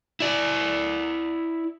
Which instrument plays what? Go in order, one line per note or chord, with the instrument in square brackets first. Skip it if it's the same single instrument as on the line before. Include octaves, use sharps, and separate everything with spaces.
[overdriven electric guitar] E4 D5